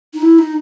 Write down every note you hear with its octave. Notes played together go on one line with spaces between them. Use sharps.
D#4
E4
D#4